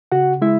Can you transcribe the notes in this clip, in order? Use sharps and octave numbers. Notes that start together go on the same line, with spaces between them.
C#3 F#4 F#5
G#3 E4 E5